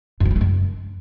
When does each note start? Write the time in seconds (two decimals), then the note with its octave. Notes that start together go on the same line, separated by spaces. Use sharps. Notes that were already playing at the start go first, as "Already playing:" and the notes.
0.20 F#2
0.26 F3
0.31 G3
0.36 A3
0.41 F#2